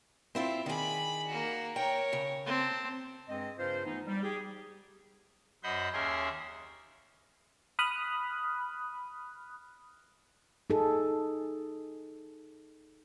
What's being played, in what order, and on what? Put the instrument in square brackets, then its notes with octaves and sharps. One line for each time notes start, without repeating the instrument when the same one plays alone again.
[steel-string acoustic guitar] C4 E4 F4
[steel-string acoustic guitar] D#3 G#4 [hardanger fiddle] D5 B5
[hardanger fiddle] A#3 F#4
[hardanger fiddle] A#4 C#5 [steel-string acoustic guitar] G5
[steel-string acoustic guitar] C#3
[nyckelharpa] C4 [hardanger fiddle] A5
[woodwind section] G2 G#3 C4 G#4 D#5
G2 C#3 F4 C5
E3 A3 B3 D#4
G3
G4 G#4
[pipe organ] F#2 C5 D#5 F#5 B5 G6
D#2 C#4 G#4 A#4 E5 C6
[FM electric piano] B5 D#6 F6 F#6
[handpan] D#4 G#4 A4